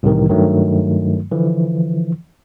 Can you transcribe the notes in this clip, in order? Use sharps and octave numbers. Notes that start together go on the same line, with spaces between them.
C2 A2 C3 D#3 E3
G2 D#3 F#3 A3
D3 E3 F3